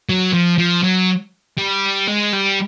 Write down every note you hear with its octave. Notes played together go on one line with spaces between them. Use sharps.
F#3
F3
F3
F#3
G3
G#3
G3